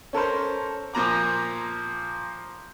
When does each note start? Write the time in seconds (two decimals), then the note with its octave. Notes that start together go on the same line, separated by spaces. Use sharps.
0.13 C#4 A4 A#4 C5
0.94 A#2 F3 A#3 A#5 D6